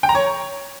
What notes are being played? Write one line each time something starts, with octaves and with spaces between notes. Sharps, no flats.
G5
A#5
C#5